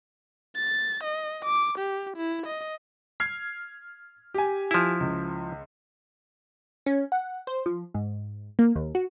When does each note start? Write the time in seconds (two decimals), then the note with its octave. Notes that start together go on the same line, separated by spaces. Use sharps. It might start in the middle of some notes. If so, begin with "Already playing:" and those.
0.56 A6
1.04 D#5
1.45 D6
1.78 G4
2.17 E4
2.47 D#5
3.20 F6 G#6 C7
4.34 G4 G#5
4.71 F3 E4
5.00 C#2
6.86 C#4
7.12 F#5
7.47 C5
7.66 F3
7.94 G#2
8.59 A#3
8.76 D#2
8.95 F#4